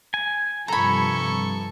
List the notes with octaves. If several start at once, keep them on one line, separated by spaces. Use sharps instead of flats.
G#5
G2 C3 F3 A4 A#5 B5 C#6